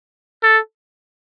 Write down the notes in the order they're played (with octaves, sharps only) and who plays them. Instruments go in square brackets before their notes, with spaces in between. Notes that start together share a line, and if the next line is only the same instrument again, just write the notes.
[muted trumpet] A4